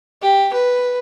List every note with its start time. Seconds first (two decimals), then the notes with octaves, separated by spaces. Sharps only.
0.22 G4
0.53 B4